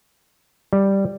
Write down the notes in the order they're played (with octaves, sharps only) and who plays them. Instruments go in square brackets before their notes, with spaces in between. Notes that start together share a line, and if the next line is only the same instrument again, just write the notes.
[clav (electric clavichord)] G3